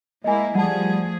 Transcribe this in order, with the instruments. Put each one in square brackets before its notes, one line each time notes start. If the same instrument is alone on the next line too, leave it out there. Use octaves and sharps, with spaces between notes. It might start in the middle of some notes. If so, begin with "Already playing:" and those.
[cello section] G#3 A#3 E4 [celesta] D#5 G#5
[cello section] F3 A3 G#4 [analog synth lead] G3 [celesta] F#5 A5